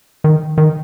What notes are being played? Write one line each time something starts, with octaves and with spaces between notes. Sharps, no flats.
D#3
D#3